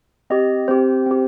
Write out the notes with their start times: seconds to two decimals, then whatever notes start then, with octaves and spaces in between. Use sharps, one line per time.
0.30 C4 G4 D#5
0.68 C4 G4 C5
1.06 C4 G4